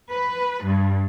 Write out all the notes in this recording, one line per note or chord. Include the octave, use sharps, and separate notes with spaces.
B4
G2